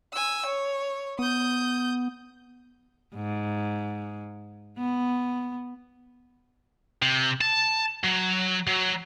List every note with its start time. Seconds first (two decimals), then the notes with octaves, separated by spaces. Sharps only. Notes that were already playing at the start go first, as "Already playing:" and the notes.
0.13 G#5 E6
0.46 C#5
1.19 B3 D#6 G6
3.14 G#2
4.78 B3
7.02 C3
7.41 A5
8.04 F#3
8.67 F#3